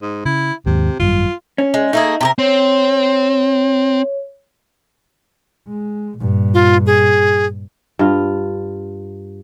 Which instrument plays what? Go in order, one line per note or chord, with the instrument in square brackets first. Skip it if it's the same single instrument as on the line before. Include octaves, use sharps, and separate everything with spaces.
[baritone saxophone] G#2
[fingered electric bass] C#3 [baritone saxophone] E4
[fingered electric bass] D#2 G#2 [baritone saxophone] C3
[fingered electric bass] G#1 F#2 G3 [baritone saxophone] F4
[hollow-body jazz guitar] C#4
[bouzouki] G#3
[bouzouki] A3 A#3 G#4 [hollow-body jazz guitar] D#4
[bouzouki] C3 G4 A#4
[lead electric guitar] C4 [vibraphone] C#5
[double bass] G#3
G2 A#2
[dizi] F4
G#4
[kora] G2 F4